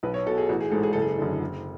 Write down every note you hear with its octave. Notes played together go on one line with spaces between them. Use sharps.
B1 B4
C#5
B2 A4
G#4
A1 F#4
G#4
G#2 E3 A4
G#4
F#1 A4
G#4
F#2 D3
F#1